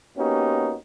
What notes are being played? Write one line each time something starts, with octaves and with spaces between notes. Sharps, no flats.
A#3 B3 C#4 D#4 F#4 G4